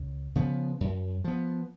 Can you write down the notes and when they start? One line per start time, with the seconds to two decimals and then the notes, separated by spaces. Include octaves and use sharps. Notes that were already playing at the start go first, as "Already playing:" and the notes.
Already playing: C#2
0.35 C#3 F3 B3
0.81 F#2
1.24 F3 B3